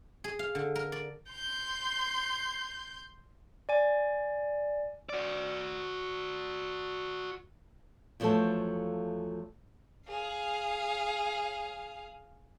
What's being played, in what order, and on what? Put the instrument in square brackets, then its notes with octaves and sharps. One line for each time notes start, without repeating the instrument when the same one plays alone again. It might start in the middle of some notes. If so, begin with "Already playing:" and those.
[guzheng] G#4
F5
D3
A#4
D5
[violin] C6 G6
[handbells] D5 G#5
[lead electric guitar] F#4 D5
[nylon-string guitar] E2 F3 F#3 A3 A4 A5
[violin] G#4 F5